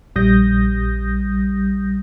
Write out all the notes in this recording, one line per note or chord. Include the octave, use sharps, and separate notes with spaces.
A#1 G3 D#6 G6 A#6